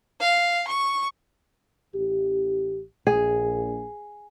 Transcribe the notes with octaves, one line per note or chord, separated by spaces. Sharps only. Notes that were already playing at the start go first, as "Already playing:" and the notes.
F5
C#6
A1 G4
A#1 G#4